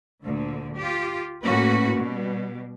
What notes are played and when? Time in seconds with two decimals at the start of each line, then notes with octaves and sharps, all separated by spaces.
0.24 D2 A#2 D3
0.77 F4 G4
1.43 A2 A#3 C#4 F#4 B4
1.97 B2 G3